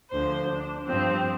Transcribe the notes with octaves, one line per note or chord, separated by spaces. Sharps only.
D2 D3 F3 C5
D4
G2 F3 C4